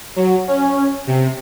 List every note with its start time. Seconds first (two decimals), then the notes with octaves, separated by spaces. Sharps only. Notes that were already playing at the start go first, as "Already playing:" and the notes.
0.16 F#3
0.48 C#4
1.07 C3